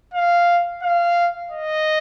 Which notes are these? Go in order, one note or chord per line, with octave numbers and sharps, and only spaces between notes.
F5
F5
D#5